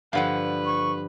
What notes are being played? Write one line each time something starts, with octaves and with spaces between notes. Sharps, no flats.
G2 D3 F3 B4 F5 F#5
C#6